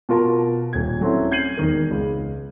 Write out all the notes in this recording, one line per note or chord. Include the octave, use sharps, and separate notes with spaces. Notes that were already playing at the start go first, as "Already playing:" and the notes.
B2 F4 A#4 A5 A#5
D#1 G#6
F#3 A3 C4 C#4 E4
G6 G#6 C7 D#7 F#7
E1 D#3 A#4
C#2